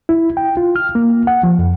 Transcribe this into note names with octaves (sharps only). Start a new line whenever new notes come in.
E4
G5
F4
F6
A#3
F#5
F3
F2